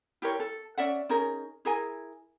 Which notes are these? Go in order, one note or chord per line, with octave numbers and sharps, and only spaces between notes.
E4 G4 A#4 C#5
A4
C#4 D5 E5 F#5
C#4 D#4 G#4 A#4
E4 G#4 A#4 G#5